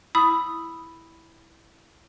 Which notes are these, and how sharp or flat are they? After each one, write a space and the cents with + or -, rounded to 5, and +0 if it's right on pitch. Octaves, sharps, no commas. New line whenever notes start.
E4 +0 B5 +0 D#6 +0